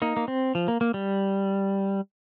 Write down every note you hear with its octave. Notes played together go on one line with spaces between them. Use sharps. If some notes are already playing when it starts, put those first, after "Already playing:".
A#3 D#4
A#3
C4
F3
A#3
A#3
G3